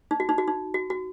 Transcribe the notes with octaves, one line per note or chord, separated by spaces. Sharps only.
D#4
F#4
D#4
F#4
D#4
F#4
F#4